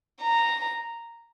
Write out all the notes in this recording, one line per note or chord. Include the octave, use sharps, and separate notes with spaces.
A#5